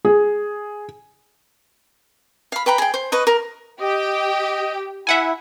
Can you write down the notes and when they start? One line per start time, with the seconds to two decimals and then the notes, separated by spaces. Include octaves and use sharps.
0.05 G#4
2.52 F5 B5
2.66 B4 G5 A#5 B5
2.78 G#4 G5
2.94 C5
3.12 B4 D#5 C#6
3.27 A#4
3.80 G4 D#5
5.07 E4 E5 F#5 G#5